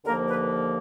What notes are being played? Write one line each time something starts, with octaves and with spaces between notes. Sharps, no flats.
D#2 D3 F3 A#3 A#4
B4